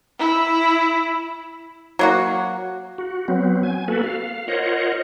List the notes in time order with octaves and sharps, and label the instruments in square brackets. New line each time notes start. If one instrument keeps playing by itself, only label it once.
[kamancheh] E4
[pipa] F#3 A#3 F#4
[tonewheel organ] F#4
F#3 B3 C4
G#5
A#3 F#4 A4 B4
F5
F4 A#4 C5 C#5 D#5 F#5